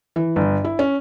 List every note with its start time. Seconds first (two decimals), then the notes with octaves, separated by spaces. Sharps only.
0.16 E3
0.36 G1
0.64 E4
0.79 C#4